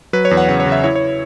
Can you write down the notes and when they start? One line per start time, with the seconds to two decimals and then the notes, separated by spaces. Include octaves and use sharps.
0.13 F#3 B4
0.25 C#5
0.31 E2
0.37 F#5
0.49 C#3 F#5
0.60 C#5
0.66 C#3
0.72 E5
0.84 E4 C#5
0.95 C#5